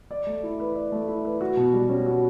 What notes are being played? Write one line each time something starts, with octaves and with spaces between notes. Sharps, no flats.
D5
A3
E4
B4
D5
A3
E4
B4
F#4
B2
G3
C#4
F#4